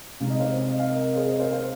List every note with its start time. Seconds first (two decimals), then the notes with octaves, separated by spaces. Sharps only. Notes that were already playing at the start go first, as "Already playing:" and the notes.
0.20 C3 G#3 C4 D#4 F5
0.30 D#5
0.40 C5 F5
0.68 D#5
0.79 F5
0.90 A#4 D#5
1.16 G#4 C5
1.28 A#4 D#5
1.39 C5 F5
1.52 C5 F5